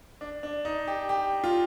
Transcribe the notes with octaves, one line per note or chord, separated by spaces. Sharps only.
D4
D4
D#4
G4
G4
F4